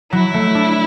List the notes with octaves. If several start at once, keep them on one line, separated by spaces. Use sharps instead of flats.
F#3 E4
A3
D4